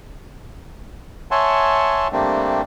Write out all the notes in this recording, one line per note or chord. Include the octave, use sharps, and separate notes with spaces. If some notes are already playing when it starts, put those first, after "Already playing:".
C#5 E5 F#5 G#5 A5 C6
C3 G3 A3 A#3 C4 D4